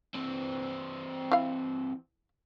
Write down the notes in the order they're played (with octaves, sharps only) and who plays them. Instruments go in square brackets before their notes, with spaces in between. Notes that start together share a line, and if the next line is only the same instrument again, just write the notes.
[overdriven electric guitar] E3 C4
[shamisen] E4 F5